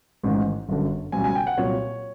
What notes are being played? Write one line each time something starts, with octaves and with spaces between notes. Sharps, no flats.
A1 G#2 D#3
G1 F#2 D3
C#2 B2 G3 G#5
G#5
G5
F#5
C2 A#2 F#3 C#5